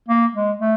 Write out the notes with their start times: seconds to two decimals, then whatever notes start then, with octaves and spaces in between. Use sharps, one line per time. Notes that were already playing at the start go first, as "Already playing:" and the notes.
0.08 A#3
0.34 G#3
0.59 A3